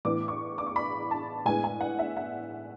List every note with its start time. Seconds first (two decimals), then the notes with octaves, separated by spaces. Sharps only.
0.05 A2 E3 B3 D6
0.28 C#6
0.58 D6
0.67 C#6
0.76 B5
1.11 A5
1.45 A2 G#3 B3 G#5
1.64 G#5
1.81 F#5
1.99 E5
2.17 F#5